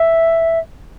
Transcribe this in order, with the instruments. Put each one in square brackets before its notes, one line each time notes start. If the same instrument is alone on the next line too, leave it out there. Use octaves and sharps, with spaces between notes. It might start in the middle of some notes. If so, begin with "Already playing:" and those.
Already playing: [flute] E5